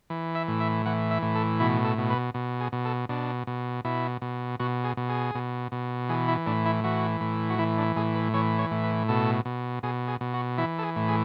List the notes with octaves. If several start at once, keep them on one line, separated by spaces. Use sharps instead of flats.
E3
E5
A2
E5
E3 F#5
E5
A2
A4
B2 E4
A4
B2
B4
B2
G#4
B2
A4
B2 D4
B2
B2 E4
B2
B2 F#4
G#4
B2
G#4
B2
B2
E3 G#4
E4
A2 D4
E4
E3 F#4
A2
F#4
E3 E4
D4
A2 G#4
B4
E3 C#5
C#5
A2
B4
B2 A4
B2
B2 G#4
G#4
B2
F#4
E3 E4
A4
G#4
A2
G#4